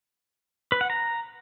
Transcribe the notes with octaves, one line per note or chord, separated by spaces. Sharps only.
B4
F#5
A#5